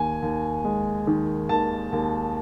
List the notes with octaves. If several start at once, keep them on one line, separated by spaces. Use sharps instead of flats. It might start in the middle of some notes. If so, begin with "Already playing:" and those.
Already playing: D#2 G#5
D#2
G#3
D#3
D#2 A5
D#2